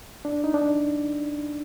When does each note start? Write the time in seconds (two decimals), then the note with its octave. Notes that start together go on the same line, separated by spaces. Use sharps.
0.25 D4
0.44 D#4
0.54 D4